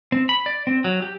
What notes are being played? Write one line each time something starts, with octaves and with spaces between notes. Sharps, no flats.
C4
B5
D5
C4
F#3
G4